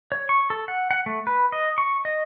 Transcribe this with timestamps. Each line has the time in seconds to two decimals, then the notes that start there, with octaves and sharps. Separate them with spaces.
0.12 C#5
0.29 C#6
0.50 A4
0.68 F#5
0.91 F#5
1.06 A3
1.27 B4
1.52 D#5
1.78 C#6
2.05 D#5